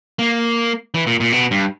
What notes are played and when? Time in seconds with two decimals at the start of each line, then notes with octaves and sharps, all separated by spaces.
0.19 A#3
0.94 E3
1.07 A#2
1.20 A#2
1.32 B2
1.51 G2